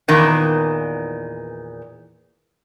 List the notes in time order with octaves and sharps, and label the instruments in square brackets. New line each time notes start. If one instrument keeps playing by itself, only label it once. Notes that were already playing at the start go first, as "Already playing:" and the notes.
[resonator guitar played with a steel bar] E2 A#2 D#3 E3